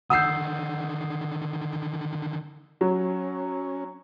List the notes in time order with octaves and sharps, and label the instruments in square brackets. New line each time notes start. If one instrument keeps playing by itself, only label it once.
[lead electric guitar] D3 D#3 [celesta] F#5 G6 [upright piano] D#6 E6 C7
[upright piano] F#3 [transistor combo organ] C#4